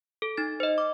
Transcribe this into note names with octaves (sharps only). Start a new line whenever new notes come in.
A4
D#4 A6
C5 D#5
D6